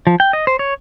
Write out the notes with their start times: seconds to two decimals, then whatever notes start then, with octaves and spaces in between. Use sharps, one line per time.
0.07 F3
0.20 G5
0.33 D#5
0.47 C5
0.59 C#5